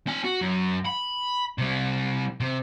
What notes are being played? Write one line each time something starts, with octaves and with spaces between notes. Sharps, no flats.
C4 G#5
F#4
F#2
B5
C3 G3
C3